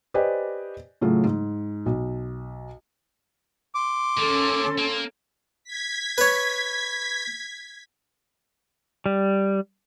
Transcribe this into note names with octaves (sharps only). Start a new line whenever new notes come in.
G4 B4 C5 D5 D#5 G#5
A2 C#3 F#3 A3 F4
G#2
B1
C6 D6
D#2 A#3 C#4 A4
A#3
G#6 B6
B4 C#5
G3